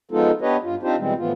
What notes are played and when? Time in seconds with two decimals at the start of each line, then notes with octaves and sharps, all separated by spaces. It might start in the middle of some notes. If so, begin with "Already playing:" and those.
0.11 F3 G#3 B3 D#4 F4 A4
0.41 B3 D4 G4 B4 C#5 D#5
0.63 G2 F4
0.83 C4 D4 D#4 F4 G4 C5
0.98 B2 E3 G3 G#3 C4
1.18 A2 E3 F3 B3 F4